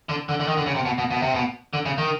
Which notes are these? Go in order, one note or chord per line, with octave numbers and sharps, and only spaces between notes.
D3
D3
D3
D#3
D3
C#3
C3
B2
B2
B2
C3
B2
D3
C#3
D#3